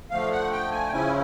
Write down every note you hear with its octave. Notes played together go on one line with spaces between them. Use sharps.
D3 F3 A3 F5
F#5
G5
G#5
G5
C#3 F3 G#3 C#4 E4 G#5